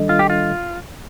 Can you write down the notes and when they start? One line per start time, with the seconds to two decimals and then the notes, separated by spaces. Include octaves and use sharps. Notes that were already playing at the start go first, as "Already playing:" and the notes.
Already playing: D#3 G3 D4 A4 D#5
0.09 F4
0.19 G4
0.30 F4